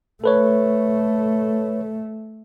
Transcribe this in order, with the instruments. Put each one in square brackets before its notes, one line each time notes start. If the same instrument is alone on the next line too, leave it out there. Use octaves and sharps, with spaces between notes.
[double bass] A3 [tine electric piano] A4 B4 C#5